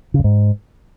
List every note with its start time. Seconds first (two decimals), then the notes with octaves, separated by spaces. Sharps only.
0.14 C#3
0.19 F#2
0.24 G#2